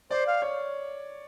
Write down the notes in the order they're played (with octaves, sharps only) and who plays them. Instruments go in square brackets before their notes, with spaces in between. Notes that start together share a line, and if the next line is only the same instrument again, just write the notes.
[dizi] C5 [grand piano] D5
[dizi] F5
[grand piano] C#5